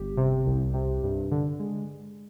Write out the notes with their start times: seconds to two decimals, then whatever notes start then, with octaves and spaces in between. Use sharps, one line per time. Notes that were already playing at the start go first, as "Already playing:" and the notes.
Already playing: G1 G4
0.17 C3
0.46 C2
0.74 C3
1.03 G2
1.31 D3
1.59 G#3